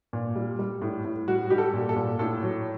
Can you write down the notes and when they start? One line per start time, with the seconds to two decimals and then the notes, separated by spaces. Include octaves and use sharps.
0.13 A#2
0.36 G3
0.59 G3
0.82 A2
1.05 A2
1.28 G3 F#4
1.50 G3 G4
1.58 A4
1.74 A#2
1.89 A4
1.96 A#2
2.19 A2 A4
2.43 F#3